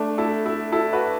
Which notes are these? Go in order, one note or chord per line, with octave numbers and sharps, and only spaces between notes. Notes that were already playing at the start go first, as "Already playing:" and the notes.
Already playing: A3 D4
E4 A4
E4 A4
E4 A4
F#4 B4